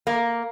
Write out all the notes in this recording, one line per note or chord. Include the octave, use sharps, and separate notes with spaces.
A#3